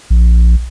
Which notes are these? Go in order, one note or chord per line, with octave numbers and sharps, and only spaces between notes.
A#1